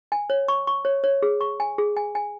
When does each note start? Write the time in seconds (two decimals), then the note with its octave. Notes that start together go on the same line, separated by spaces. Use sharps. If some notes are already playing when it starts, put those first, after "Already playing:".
0.12 G#5
0.30 C#5
0.48 C#6
0.67 C#6
0.85 C#5
1.04 C#5
1.22 G#4
1.41 C#6
1.60 G#5
1.78 G#4
1.97 G#5
2.15 G#5